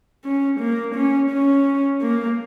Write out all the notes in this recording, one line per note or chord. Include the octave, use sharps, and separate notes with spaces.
C#4
A#3
C#4
C#4
A#3